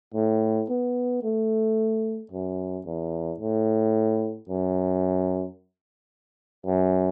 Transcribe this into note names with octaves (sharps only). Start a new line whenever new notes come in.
A2
B3
A3
F#2
E2
A2
F#2
F#2